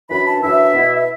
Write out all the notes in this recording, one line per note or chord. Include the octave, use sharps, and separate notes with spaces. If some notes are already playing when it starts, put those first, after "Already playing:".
F#2 E3 D4 B5
A5
F#2 E3 D4 E5
B2 B3 E4
E5